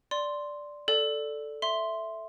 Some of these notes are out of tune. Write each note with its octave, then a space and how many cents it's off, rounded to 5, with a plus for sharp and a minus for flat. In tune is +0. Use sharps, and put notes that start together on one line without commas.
D5 +0 C6 +0
A4 +0 D5 +0
E5 +0 C6 +0